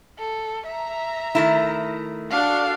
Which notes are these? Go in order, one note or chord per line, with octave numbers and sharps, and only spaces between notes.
A4
E5 A#5
D#3 A3 E4
D4 F#4 A4 F5